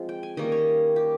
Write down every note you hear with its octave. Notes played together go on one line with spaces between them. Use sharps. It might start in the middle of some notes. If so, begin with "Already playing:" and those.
Already playing: F3 G#3 C4
G5
G#5
D#3 G3 A#3 C#4 D#5
C#5
G4